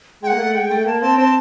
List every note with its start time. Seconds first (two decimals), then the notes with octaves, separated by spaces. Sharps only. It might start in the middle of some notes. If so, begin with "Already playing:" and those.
0.22 G#3 G5
0.27 A#3 F#5
0.39 A3
0.55 G#3 G5
0.71 A3
0.86 A#3 A5
1.02 C4 A5
1.18 C4 A5